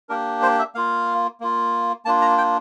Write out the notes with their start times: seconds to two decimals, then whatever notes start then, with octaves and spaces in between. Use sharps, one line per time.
0.09 A#3 D4 G4 A#4
0.42 C5
0.59 E5
0.75 A#3 F4 F5
1.40 A#3 F4
2.05 A#3 D4 F4 A5
2.22 A#5
2.38 G5